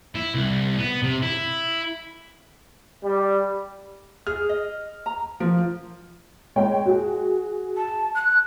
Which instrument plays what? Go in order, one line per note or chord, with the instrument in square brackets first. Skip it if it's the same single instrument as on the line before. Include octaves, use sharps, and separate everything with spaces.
[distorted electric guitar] E4
C2
B3
C3
E4
[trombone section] G3
[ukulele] G#4 [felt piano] F6
[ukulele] D#5
A#5
[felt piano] F3 [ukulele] A#4
[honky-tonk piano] G#3 C#5 G5
F#4 G#4
[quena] A5
F#6